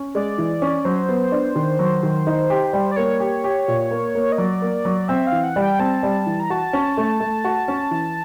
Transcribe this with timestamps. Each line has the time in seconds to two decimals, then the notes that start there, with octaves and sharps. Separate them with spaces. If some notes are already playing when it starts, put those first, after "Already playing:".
Already playing: C#4
0.15 G#3 D5
0.38 E3
0.62 C#4
0.85 F#3 C5
1.09 B3
1.32 D4
1.55 D#3
1.79 F#3
2.03 D#3
2.27 D#4
2.50 G4
2.73 G3
2.91 D5
2.96 A#3 C#5
3.20 G4
3.44 G4
3.68 A#2
3.91 A#3
4.15 A#3
4.32 D#5
4.38 F#3 D5
4.62 A#3
4.85 F#3
5.08 C4 E5
5.27 F5
5.32 E3
5.44 F#5
5.56 G3
5.62 G5
5.79 C4 A5
6.03 G3
6.26 E3
6.40 A#5
6.50 F#4 A5
6.73 C#4
6.97 A3
7.20 A3
7.44 F#4
7.68 C#4
7.91 E3